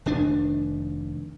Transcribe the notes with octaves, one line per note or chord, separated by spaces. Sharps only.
F1 D#3 D4